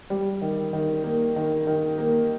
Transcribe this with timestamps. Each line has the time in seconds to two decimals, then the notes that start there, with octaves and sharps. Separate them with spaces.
0.10 G3
0.42 D#3
0.73 D#3
1.04 A#3
1.36 D#3
1.67 D#3
1.98 A#3